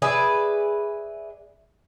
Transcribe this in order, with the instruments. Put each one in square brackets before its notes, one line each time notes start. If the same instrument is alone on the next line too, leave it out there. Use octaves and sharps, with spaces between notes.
[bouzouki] G#4 B4 D5 E5